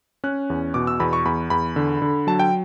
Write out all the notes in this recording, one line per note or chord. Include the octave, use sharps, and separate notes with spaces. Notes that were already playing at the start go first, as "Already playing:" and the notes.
C#4 F#6
E2
B2 D6
E6
E2 B5
C#6
E2 B5
E2 B5
D3
D3
F#3 A5
G5